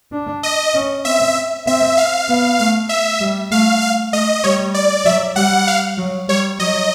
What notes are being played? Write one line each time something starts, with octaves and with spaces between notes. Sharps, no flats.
D4
D#5
C#4
C4 E5
C4 E5
F5
B3
A3 F5
E5
G3
A3 F5
F5
A3 D#5
G3 C#5
D5
F#3 E5
G3 F#5
F5
F#3
G3 C#5
F#3 D#5